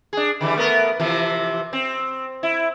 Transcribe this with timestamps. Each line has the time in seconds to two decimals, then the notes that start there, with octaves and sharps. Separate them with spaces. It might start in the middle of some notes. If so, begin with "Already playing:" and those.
0.13 D4 G#4
0.41 D3 E3 G3
0.56 A3 B3 A#4
1.00 C3 E3 F3
1.73 C4
2.43 E4